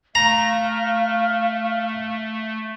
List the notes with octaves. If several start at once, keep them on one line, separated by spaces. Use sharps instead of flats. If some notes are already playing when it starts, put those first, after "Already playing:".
A3 F5 A#5 F6